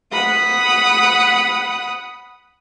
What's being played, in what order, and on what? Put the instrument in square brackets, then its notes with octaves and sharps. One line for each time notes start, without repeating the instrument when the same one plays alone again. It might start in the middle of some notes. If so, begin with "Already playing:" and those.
[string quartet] F#5 B5 D#6